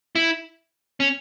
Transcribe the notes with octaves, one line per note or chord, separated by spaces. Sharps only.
E4
C#4